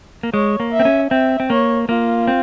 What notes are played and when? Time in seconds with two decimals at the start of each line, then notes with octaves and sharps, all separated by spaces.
0.23 A#3
0.34 G#3 C#5
0.60 A#3
0.73 E5
0.80 C4
0.85 C#4
1.11 C4 E5
1.40 C4
1.50 A#3 C#5
1.88 A#3 F4
2.28 C4